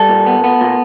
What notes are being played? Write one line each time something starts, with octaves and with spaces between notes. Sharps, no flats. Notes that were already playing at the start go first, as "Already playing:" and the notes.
Already playing: G3 A4
A#2
B3
B3
A#2